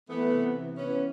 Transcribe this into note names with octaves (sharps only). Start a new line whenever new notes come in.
E3 A3 B3
C3
E3
E3 B3 C#4